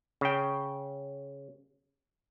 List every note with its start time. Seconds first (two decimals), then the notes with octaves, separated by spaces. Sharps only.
0.21 C#3 G5